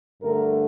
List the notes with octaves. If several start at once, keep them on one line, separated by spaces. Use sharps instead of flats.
G2 D3 A3 A#4